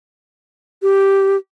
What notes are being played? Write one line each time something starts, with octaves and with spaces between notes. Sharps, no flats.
G4